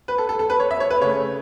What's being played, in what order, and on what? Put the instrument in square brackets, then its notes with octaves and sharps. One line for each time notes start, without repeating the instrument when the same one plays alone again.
[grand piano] B4
A4
A4
A4
B4
C#5
E5
C#5
B4
C#3 A3 C#5